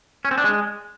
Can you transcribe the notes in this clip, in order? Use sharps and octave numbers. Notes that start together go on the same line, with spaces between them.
C#4
C4
D4
G#3